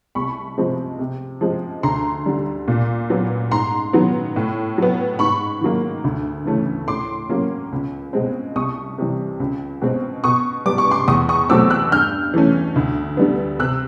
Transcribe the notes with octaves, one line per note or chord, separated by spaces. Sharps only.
C2 B5 C#6
C3 F3 G#3 C4
C3
F3 G#3 C4
D2 A#5 C6
D3 G3
A#2
F#3 B3
G#2 A#5 C6
D#3 F#3 B3
A2
F#3 B3
G#2 B5 C#6
D#3 F#3 A#3
D2
C#3 E3 A3 C#4
A2 C6 D6
F#3 A#3 C#4
C#2
B2 G#3 C4
C2 C#6 D#6
C3 E3 G3
C#2
B2 G#3 C4
B2 C#6 D#6
G3 B3 D6
C#6
C6 D6
E2 C#6 D#6
C#6 D#6
B2 F#3 A3 C4 D6 E6
E6 F#6
G2 F6 G6
E3 A3 C#4
D2
D3 G3 B3
C3 E6 F#6